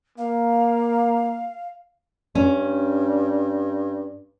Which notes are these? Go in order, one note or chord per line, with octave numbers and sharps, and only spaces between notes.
A#3 F5
G2 C#4